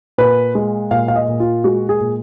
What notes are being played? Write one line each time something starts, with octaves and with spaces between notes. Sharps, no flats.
A#2 B4
G#3
A#2 F5
F5
D#5
A#2
F4
G#3 F#4
G#4
A#2